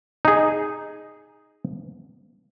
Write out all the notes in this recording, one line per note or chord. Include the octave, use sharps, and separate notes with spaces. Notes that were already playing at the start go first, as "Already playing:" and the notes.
D#4 G#4